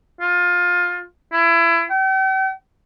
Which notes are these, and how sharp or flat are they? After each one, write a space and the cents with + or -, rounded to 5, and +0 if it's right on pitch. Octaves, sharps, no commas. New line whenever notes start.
F4 +20
E4 +30
G5 -45